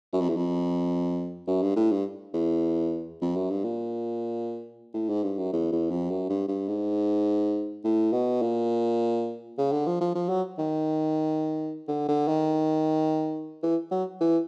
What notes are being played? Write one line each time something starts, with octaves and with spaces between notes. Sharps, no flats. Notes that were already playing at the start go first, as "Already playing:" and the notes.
F#2
F2
E2
F2
F#2
G2
A2
G2
E2
F2
F#2
G2
A#2
A2
G#2
G2
F#2
E2
E2
F2
F#2
G2
G2
G#2
A2
B2
A#2
C#3
D3
F3
F3
F3
F#3
D#3
D3
D3
D#3
E3
F#3
E3